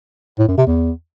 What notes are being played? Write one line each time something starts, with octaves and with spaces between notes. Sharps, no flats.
A2
F#2
C3
E2